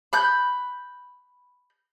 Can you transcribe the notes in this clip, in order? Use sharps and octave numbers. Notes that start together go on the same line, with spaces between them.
B5 F#6 G6